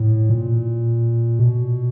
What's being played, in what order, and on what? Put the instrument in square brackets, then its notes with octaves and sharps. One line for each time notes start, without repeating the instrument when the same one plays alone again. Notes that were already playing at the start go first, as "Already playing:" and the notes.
Already playing: [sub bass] A2
A#2
B2